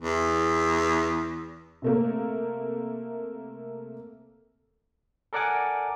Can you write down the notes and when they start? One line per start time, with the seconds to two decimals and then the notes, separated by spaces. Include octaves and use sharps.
0.01 E2
1.82 C3 A3 A#3
5.33 A4 A#4 D5 F#5 G#5 D6